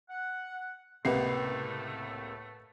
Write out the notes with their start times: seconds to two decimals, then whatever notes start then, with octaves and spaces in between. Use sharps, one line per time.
0.10 F#5
1.05 C#2 A2 C3 A3 A#3 B4 F#5 C7